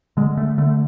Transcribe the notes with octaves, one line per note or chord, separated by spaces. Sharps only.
D3 G#3
A3
D3 A3